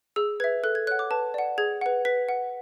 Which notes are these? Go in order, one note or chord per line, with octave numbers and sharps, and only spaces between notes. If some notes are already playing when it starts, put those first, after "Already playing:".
G#4 E6
B4 E5 G#6
A4 F#6
G#6
C#5 F#5 F#6
D6
B4 A5
D5 F#5
G#4 G#6
B4 F#5
B4 B6
F#5